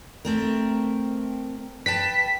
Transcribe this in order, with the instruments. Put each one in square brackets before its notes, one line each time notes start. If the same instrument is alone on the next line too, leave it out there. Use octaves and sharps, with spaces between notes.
[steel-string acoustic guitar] A3 C4 A#4
[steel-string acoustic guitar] B4 G5 A5 [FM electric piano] B6